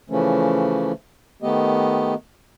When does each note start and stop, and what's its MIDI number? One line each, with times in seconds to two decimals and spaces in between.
0.10 0.92 49
0.10 0.92 52
0.10 0.92 53
0.10 0.92 57
0.10 0.92 61
1.42 2.14 51
1.42 2.14 57
1.42 2.14 59
1.42 2.14 67
1.42 2.14 75